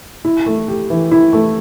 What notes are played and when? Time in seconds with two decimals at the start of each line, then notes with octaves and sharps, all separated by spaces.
0.25 E4
0.46 A3
0.68 G4
0.90 E3
1.11 E4
1.33 A3